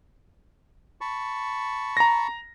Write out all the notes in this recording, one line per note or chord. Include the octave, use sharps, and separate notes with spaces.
A5 B5 C#6
A#5 A#6